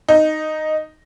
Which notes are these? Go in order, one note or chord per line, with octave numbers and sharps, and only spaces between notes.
D#4